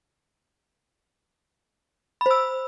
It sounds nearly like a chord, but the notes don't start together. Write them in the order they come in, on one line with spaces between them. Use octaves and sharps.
B5 C5 E6